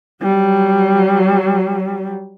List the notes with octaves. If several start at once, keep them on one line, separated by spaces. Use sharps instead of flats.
F#3 G3